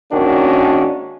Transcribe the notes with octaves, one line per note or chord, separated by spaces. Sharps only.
G#1 D#3 A#3 C#4 D4 F#4